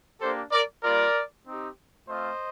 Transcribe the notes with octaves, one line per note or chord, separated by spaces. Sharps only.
A#3 D4 G4 A4 C5
A#4 D5
G3 A#3 F4 A#4 D5
C4 D#4 G4
A3 C4 F4 C5 D#5